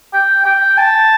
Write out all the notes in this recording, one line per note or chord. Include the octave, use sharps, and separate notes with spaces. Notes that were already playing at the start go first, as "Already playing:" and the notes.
G5
G5
A5